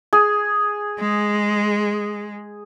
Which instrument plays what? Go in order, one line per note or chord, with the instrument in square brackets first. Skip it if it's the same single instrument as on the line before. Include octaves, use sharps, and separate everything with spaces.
[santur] G#4
[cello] G#3